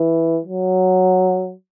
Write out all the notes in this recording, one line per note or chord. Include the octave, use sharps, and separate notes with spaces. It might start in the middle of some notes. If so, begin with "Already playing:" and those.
Already playing: E3
F#3